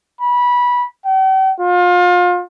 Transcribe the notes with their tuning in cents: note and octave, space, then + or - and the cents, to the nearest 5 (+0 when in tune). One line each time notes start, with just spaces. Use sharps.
B5 -20
G5 -45
F4 +30